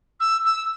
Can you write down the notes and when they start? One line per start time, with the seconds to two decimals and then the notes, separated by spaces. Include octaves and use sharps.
0.20 E6
0.45 E6